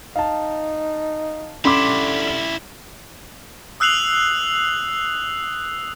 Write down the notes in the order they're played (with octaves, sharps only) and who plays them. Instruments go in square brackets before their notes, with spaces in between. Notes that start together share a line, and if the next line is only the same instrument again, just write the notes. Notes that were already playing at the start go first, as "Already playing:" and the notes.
[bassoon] D#4 [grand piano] F5 A5
[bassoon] D3 [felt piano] C#4 [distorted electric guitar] E4 G4 [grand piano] B5 C6 D6
[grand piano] G7
[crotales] D#6 E6 F#6 C7 F7 F#7